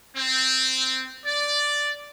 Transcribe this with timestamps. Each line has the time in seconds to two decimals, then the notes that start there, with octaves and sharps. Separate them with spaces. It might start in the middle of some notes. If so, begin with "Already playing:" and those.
0.16 C4
1.26 D5